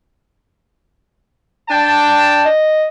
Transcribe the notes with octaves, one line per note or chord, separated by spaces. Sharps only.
D4 G5 A5
D#5